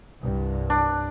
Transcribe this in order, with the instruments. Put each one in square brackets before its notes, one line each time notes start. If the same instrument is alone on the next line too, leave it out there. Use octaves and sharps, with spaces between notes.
[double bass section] C2 G2
[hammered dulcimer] D4